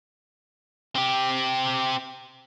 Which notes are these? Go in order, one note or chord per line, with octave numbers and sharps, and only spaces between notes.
C4 G4